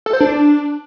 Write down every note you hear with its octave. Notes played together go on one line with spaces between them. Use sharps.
A4
C5
D4